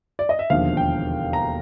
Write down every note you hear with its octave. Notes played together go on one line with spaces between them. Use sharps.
D5
D#5
E5
E1 D#2 D3 F3 F5
G5
A#5